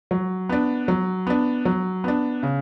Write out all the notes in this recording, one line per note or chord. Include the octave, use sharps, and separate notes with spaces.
F#3
B3 D4
F#3
B3 D4
F#3
B3 D4
C#3